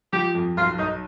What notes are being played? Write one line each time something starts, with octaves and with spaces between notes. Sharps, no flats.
F3 G4
F2
B1 F4
B1 D#4